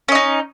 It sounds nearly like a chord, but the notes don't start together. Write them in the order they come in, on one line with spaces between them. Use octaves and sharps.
C#4 D#5 D#4